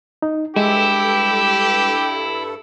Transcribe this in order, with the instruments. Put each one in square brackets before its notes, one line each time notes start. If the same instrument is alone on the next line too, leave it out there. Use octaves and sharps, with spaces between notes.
[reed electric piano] D#4
[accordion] G2 A4 [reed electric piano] G#3 [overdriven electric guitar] E4 [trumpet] G4